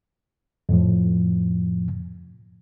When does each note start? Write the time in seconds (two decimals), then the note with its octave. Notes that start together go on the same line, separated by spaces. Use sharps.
0.69 F2 A2 F3